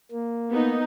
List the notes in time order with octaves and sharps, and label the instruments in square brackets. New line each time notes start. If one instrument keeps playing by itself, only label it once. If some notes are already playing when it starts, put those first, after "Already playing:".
[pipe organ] A#3
[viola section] B3 D#4